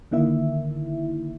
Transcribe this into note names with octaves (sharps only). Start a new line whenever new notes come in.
D3 D#3 A#3 E4 E5